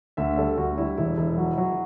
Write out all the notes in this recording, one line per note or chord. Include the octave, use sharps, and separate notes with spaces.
D2 E5
G3 A4
D2 F#4
G3 E4
E1 E4
E1
F#3
F#3